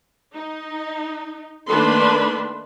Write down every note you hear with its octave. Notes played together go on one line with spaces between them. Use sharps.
D#4
D#3 A3 A#3 D4 B4 C6